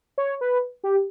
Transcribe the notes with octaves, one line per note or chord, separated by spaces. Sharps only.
C#5
B4
G4